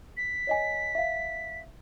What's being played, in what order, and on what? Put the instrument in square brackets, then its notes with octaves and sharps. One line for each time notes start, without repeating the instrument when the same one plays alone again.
[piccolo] B6
[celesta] C#5 D#5 G#5
E5 F5